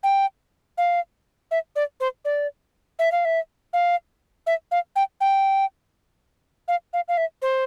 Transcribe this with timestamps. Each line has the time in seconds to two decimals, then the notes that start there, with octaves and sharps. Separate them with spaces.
0.03 G5
0.78 F5
1.51 E5
1.76 D5
2.00 C5
2.25 D5
2.99 E5
3.12 F5
3.25 E5
3.73 F5
4.47 E5
4.71 F5
4.96 G5
5.21 G5
6.68 F5
6.93 F5
7.08 F5
7.17 E5
7.42 C5